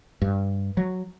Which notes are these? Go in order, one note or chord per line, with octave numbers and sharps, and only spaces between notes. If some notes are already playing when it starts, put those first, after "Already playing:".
G2
F#3